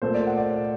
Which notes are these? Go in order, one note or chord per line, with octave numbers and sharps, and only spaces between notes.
A#2 A3 C5
D5
F#5
D5
D5